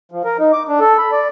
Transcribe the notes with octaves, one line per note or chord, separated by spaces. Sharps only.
F3
A#4
D#4
D6
D4
A4
B5
D5